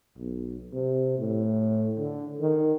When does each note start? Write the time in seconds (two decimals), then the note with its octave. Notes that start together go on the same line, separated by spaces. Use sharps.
0.18 B1
0.72 C3
1.19 A2
1.98 D3
2.41 D#3